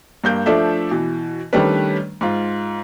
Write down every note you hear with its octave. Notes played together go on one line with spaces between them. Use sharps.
G2 A#3 G6
F3 A3 D4 A4 E5
B2 E3
D#3 G3 A3 C#4 D4 B4
G#2 F4